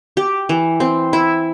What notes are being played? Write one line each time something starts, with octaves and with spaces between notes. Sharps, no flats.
G4
E3
C4
E4